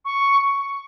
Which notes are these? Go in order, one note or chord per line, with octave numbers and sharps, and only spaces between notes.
C#6